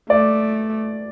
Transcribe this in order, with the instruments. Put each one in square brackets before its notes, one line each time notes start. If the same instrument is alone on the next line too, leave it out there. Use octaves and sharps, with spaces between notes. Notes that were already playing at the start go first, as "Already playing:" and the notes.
[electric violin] A3 [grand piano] D5